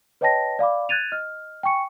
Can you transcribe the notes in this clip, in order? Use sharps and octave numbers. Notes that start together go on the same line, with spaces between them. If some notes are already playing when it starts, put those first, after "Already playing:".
B4 C#5 D#5 G5 A5 A#6
D5 F5 B5 D6
F#6 G#6 A6 D#7 F7
D#5 F6
G5 G#5 C#6 C#7